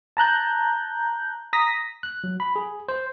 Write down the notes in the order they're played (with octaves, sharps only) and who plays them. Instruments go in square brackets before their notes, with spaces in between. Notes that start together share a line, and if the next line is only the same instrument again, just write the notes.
[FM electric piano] A5 A#5 F#6 G6
A#5 D#6 A#6 B6
[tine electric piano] F#6
F#3
B5
G#4
C5